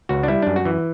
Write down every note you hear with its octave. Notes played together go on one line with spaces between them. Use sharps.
C#2 F#4
D4
G3 E4
F#2 D4
F#4
E3